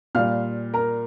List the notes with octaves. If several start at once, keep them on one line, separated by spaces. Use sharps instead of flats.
A#2 G3 F5 F6
A#4 A#5